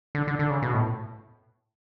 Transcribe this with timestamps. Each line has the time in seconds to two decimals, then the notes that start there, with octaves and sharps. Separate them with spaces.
0.15 D3
0.27 D3
0.39 D3
0.50 C#3
0.62 B2
0.73 A2